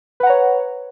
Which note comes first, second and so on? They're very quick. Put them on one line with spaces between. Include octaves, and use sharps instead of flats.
B4 F#5 A#5 C#5